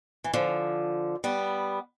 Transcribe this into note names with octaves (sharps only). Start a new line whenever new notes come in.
E3
D3 F3
G3 B3